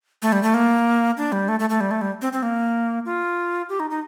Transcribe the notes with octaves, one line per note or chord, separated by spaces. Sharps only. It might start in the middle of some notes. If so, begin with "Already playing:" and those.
A3
G3
A3
A#3
D4
G3
A3
A3
A3
G3
A3
G3
C4
C4
A#3
F4
G4
D#4
D#4